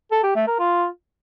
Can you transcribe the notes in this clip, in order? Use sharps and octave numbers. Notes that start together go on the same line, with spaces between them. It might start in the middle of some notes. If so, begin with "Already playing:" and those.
A4
G4
A3
A#4
F4